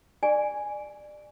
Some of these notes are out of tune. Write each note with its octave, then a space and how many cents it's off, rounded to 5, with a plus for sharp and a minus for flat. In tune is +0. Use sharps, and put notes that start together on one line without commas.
G4 +30 D5 +25 G#5 +0